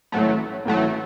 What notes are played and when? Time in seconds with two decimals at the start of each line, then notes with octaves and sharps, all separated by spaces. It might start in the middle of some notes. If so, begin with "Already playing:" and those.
0.12 A1 A2 F#3 A3
0.65 A1 A2 F#3 A3